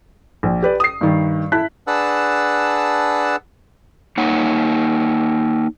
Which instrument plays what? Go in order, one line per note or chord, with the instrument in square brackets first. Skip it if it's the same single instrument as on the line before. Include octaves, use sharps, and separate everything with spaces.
[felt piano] A#1
G4 B4 D5
D#6 C7
G2 D#3
E4 A5 F#6 B6
[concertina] D4 G#4 B4 F#5 A5 E6
[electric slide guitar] A#3 D#4 C#5 F#5